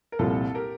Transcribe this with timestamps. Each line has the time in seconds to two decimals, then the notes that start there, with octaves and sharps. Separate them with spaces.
0.12 A#4
0.19 C2 A#2 F3 F4 A4
0.55 G4 A#4